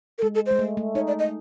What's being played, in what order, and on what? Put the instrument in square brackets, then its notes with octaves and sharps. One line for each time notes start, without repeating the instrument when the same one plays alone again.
[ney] A#4
[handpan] G#3 [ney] A4
[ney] A4
[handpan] G#3 [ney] C5
[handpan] A3
A3
[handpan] D#4 [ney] C#5
[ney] D5
D#5